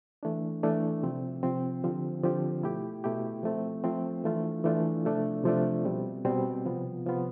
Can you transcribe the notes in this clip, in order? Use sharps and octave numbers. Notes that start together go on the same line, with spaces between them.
E3 A3 D4
E3 A3 D4
C3 F3 C4
C3 F3 C4
D3 F3 C4 G4
D3 F3 C4 G4
B2 A3 E4 G4
B2 A3 E4 G4
F3 A3 C4
F3 A3 C4
E3 A3 D4 F4
E3 A3 D4 F4
C3 F3 A3 D4
C3 F3 A3 D4
B2 G3 C4
B2 G3 C4
C3 F3 B3 F4
C3 F3 B3 F4